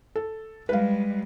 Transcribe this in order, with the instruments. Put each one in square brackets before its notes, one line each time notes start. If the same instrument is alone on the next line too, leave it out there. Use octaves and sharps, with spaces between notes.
[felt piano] A4
[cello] G3 G#3 [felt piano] B4 F5